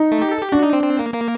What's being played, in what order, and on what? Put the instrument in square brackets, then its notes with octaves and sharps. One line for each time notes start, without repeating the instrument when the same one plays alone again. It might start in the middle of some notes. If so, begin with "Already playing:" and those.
Already playing: [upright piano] D#4
[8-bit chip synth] A3
G4
A4
G4
[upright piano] D4 [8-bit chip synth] F#4
[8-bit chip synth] D#4
C4
C4
A#3
A#3